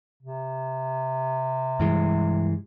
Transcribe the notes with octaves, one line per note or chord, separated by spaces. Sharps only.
C3
G2 E3 G#3